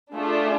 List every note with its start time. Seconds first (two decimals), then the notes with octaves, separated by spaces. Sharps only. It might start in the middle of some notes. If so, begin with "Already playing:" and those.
0.15 A3 D4 F4 G#4